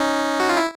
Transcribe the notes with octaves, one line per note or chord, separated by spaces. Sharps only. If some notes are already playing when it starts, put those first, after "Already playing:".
Already playing: C#4 D#4
F#4
F4
E4